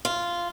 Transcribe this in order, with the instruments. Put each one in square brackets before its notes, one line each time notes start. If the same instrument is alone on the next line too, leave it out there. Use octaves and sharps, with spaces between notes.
[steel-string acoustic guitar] F4